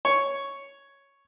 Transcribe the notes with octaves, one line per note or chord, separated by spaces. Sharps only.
C#5